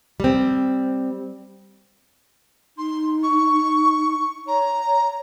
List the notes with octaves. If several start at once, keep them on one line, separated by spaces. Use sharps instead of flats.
G3 C4
D#4 C6
C#6
C#5 A#5